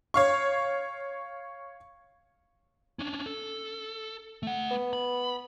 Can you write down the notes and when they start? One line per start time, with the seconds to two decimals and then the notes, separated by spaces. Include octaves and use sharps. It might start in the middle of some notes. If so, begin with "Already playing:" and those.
0.14 C#5 F5 C#6
2.99 C#4 D4
3.26 A4
4.43 A3 F#5
4.71 B3
4.93 B5